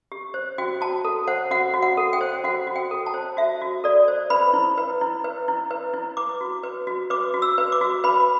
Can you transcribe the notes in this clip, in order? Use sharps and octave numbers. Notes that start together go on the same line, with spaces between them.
G4
C5
F#4 G5
F#4 A5
A4
C5 F#5
F#4 F#5
F#4
F#5
A4
G5
C5
F#4 F#5
F#4
G5
A4
A5
C5
F#4 E5
F#4
A4 D5
C5
B4 B5
E4
B4
E4
B4
E4
B4
E4
B4 D6
F#4
B4
F#4
B4 D6
F#4
E6
B4
D6
F#4
B4 B5